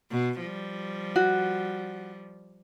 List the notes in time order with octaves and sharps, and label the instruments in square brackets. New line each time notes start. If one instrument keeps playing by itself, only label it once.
[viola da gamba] B2
F3 G3
[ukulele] F#4